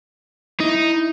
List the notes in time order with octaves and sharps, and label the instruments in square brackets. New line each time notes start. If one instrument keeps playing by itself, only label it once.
[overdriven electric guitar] D#4 [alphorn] E4